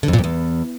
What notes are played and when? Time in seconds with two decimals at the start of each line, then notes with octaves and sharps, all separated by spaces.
0.03 D3
0.08 F2
0.13 A#2
0.19 F2
0.24 E2